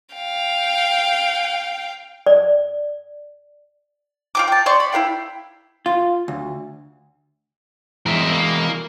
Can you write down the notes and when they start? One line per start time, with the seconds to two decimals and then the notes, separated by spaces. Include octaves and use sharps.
0.15 F5 G5
2.26 D5
4.35 F4 G5 D6
4.48 G5 A5
4.66 D5 C6 C#6
4.80 B5
4.92 E4 A#4 F5 G5
5.86 F4
6.28 D2
8.06 E3 G#3 A#4 E5
8.32 A#3